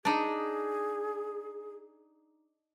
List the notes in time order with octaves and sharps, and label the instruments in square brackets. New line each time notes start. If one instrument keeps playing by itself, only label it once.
[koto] D4 D#4 [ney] G#4